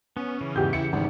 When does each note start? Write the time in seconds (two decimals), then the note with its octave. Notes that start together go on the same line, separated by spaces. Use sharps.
0.17 B3 C#4
0.41 C#3 E3
0.56 E2 G#2 G4 G6
0.73 E4 C#7
0.93 G#1 G3